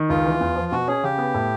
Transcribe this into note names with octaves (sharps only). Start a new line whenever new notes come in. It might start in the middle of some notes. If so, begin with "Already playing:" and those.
Already playing: D#3
C#2 F4
E3
E2
F3
B2 F#4
C#4 G#4
C#3 G4
B3
A2